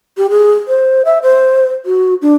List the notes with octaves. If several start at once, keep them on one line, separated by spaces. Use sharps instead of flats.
G4
G#4
C5
E5
C5
F#4
D4